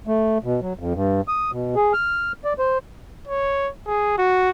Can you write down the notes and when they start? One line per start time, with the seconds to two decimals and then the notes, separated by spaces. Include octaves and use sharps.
0.07 A3
0.44 B2
0.62 F#3
0.79 F2
0.94 G2
1.28 D#6
1.52 B2
1.75 G#4
1.93 F6
2.44 D5
2.59 C5
3.27 C#5
3.86 G#4
4.18 F#4